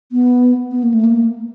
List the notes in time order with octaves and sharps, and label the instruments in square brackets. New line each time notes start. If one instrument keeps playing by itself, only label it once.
[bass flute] B3
B3
A#3
A3
A#3